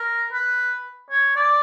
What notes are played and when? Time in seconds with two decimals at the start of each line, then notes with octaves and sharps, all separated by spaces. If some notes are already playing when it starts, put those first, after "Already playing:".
Already playing: A#4
0.33 B4
1.10 C#5
1.36 D5